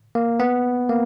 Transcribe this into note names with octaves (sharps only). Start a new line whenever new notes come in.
A#3
B3
A#3